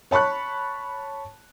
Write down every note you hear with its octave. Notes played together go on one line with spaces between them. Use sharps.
C#5 A5 B5 C#6 F#6